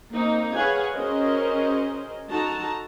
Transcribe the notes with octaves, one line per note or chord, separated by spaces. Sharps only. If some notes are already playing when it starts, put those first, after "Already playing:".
A#3 C4 D#4
G#4 B4 C#5 F5 F#5 G#5
C#4 F#4 G#4 A#4 C5 D#5
D#4 F#4 A4 A5 A#5